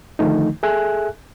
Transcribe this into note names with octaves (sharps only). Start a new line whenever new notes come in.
D3 D#3 F3 A3 D#4
G#4 A4 E5 G#5 F#6